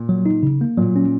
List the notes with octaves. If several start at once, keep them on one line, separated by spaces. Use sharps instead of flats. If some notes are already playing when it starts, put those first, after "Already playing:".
Already playing: A#2
F#3
D#4
C#3
A#3
A#2 F#3
C#4